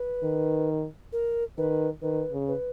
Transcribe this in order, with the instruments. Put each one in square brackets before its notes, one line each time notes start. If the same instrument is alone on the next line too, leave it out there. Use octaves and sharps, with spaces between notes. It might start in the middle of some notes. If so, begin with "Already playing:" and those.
Already playing: [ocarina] B4
[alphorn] D#3
[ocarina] A#4
[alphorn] D#3 [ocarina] B4
[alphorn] D#3 [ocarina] B4
[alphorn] C#3
[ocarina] B4